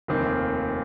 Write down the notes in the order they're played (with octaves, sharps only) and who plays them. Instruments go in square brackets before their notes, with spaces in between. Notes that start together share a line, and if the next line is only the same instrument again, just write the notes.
[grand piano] F1 D#2 D#3 C4